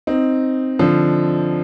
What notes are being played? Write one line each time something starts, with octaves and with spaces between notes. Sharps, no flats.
C4 D#4
D3 F3